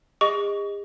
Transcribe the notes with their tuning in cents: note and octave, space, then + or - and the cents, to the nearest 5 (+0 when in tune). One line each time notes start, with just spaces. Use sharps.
G#4 -45 D#5 +0 C#6 +25